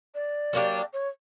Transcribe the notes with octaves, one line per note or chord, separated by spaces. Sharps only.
D5
F#3 A#3 D4 G4
C#5